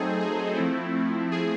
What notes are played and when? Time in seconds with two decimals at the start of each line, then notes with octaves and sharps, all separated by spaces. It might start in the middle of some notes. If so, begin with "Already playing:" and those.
Already playing: F#3 A3 C4 D#4 G#4 A4 C5
0.21 G#4
0.56 F3 A3 C4 E4
1.32 G#4